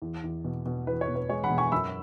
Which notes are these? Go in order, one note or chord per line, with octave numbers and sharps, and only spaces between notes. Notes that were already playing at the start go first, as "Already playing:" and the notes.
E2
E2
B2
B2
E2 B4
C#5
B2
B4
G#3 C#5
F#5 B5
B2
G#5 C#6
F#2 B5 E6